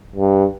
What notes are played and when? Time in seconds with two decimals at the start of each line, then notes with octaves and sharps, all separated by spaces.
0.15 G2